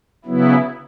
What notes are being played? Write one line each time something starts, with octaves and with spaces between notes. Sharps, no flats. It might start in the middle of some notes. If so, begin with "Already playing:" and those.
C#3 F#3 B3 E4